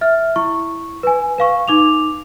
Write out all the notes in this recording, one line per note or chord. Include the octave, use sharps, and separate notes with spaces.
E5 F6
E4 C#6
B4 G#5
B4 F5 C#6
D#4 D6 F7